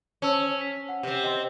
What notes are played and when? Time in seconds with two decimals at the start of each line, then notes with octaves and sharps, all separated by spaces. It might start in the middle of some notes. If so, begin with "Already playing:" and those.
0.22 C#4 C5 A5 E6
0.61 B6
0.89 F#5
1.03 C3 C4
1.23 D#5 G5 C6